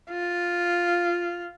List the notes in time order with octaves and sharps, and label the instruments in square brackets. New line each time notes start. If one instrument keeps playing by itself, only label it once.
[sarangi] F4